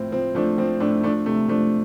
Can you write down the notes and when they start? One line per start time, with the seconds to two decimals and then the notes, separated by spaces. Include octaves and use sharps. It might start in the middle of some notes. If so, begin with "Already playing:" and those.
Already playing: A2 F3 C4
0.12 F3 C4
0.35 F3 A3 D4
0.58 F3 C4
0.80 A2 A3 D4
1.03 F3 A3 D4
1.26 C3 A3
1.49 F3 A3 D4